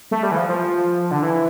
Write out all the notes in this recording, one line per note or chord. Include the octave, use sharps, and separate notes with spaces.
A3
G3
E3
F3
F3
D3
E3